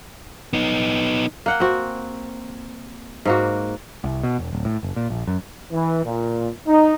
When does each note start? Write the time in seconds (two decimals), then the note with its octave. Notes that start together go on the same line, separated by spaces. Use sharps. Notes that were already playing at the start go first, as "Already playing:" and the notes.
0.53 B3 D#4
1.46 A#3 F#5 G5
1.60 C4 F#4
3.25 G#2 A#3 F#4
4.04 C2
4.23 B2
4.39 E1
4.53 D1
4.65 A2
4.83 F#1
4.96 A#2
5.10 A#1
5.27 F#2
5.72 E3
6.05 A#2
6.66 D#4